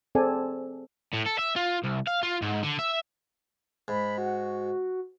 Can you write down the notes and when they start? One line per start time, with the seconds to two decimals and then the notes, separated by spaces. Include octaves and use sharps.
0.15 C4 G#4 A4 D5 G#5
1.14 A2
1.26 A4
1.39 E5
1.56 F4
1.84 C2
2.07 F5
2.23 F4
2.42 G#2
2.63 D3
2.79 E5
3.88 G#2 B5
4.18 F#4